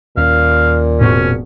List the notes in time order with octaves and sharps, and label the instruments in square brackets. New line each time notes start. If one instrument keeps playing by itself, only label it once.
[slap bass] D#2 C#4 [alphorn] A#2 [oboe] F5
[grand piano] E1 C4 C#6 [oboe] C#4